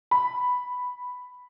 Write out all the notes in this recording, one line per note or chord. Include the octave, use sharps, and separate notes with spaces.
B5